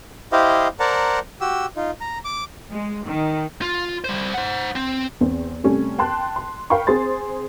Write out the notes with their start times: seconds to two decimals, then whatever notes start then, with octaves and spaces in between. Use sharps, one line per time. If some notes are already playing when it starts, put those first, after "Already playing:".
0.32 E4 G4 C5 D#5 F5
0.80 A#4 C5 D5 F#5 A5 A#5
1.41 F#4 G4 E6
1.76 D#4 F4
2.01 A#5
2.24 D6
2.71 G#3
3.05 D#3
3.62 F4
4.04 G3 C5
4.34 C5 F#5
4.76 C4
5.21 E2 C4
5.64 C3 G3 A3 C#4
5.99 G5 A5 C6 F#6
6.36 C6
6.70 A#4 F5 G5 B5 C#6
6.87 C4 G#4 C5 C6 A6